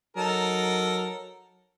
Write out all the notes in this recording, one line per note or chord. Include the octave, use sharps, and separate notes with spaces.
F#3 D#4 A4 A#4